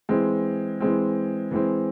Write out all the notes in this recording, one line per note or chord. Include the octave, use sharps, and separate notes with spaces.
E3 G#3 C4
E3 G#3 C4
E3 G#3 C4